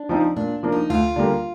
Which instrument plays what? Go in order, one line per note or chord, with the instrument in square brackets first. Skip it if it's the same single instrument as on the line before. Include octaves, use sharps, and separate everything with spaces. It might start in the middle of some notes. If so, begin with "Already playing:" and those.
Already playing: [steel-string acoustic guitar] D4
[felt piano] F3 C4 D#4
[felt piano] A#2 [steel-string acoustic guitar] D4
[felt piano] F3 A#3 D4
[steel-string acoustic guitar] D#4
[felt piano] D2 [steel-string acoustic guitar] F4
[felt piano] D3 G3 A#3